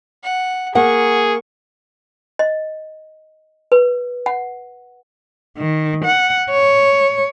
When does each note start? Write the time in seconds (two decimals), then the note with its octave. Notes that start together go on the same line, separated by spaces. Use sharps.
0.23 F#5
0.75 A#3 G#4 F#5 C#6
2.39 D#5
3.72 B4
4.26 F#5
5.58 D#3
6.05 F#5
6.51 C#5